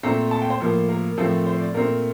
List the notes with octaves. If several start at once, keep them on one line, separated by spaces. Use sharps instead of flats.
A#2 A3 C4 A#5
A5
G5
C5
A2 F3 A#3
A#4
A2 F3 A3 C4
C5
D5
A#2 A3 C4 A#4